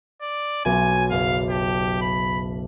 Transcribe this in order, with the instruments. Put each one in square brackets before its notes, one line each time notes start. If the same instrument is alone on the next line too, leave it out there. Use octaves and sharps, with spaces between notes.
[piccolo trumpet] D5
[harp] B1 C#4 [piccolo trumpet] G#5
[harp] F#1 [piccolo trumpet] F5
[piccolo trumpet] G4 [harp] A5
[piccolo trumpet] B5